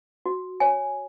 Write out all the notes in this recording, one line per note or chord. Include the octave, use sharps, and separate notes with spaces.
F#4
C#5 G#5